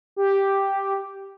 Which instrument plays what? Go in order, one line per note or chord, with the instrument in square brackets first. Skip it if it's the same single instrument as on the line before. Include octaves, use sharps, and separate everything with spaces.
[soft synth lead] G4